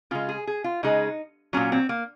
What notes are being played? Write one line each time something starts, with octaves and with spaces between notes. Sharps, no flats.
C#3 G#3 F4
G#4
G#4
F4
C#3 G#3 D#4
A#2 F#3 C#4
C4
A#3